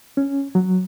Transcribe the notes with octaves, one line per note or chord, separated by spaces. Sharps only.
C#4
F#3